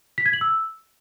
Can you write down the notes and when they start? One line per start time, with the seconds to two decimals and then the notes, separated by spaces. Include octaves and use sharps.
0.18 B6
0.26 G#6
0.33 F#7
0.41 E6